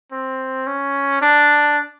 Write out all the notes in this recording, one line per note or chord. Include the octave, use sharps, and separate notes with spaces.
C4
C#4
D4